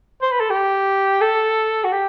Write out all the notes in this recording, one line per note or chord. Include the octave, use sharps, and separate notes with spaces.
C5
B4
A4
G4
A4
F#4
G4